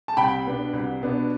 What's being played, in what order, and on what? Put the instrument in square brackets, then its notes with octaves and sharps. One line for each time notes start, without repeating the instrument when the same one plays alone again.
[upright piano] A5
[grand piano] C2 [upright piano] G5 B5
[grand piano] B2 B3 D4
C2
B2 B3 D4